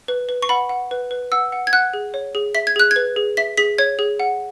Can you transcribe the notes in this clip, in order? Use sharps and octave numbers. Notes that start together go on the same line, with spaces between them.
B4
B4
C#6
F#5 B5
F#5
B4
B4
F#5 E6
F#5
G#6
F#5 F#6
G#4
C#5
G#4
E5 B6
G#6
G#4 F#6
G#6
B4
G#4
E5 B6
G#4 B6
C#5 G#6
G#4
F#5